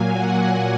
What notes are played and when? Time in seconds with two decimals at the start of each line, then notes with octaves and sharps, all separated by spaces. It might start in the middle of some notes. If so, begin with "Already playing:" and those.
Already playing: A#2 F#3 A#3 G#5
0.12 F#5